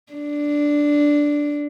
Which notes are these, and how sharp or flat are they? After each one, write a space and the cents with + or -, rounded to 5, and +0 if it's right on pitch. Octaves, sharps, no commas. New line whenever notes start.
D4 -5